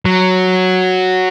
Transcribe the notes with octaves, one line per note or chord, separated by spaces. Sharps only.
F#3